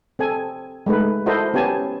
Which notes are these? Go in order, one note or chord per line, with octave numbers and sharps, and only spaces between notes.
C4 A4 G#5
G#3 A3 D#4 B4
E4 F#4 A4 A#4 C5 D#5
B3 C#4 G4 G#5 A5